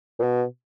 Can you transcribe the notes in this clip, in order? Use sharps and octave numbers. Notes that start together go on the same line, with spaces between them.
A#2
B2